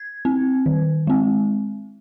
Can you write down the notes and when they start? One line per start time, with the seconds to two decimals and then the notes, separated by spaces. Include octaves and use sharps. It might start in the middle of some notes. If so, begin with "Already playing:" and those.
Already playing: G#6
0.25 C4
0.66 D#3
1.07 G#3 C4